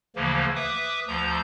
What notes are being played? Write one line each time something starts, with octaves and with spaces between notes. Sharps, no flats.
D2 C#3 E3 F3 A#3
B4 E5 D6 D#6
D2 F3 A#5 G6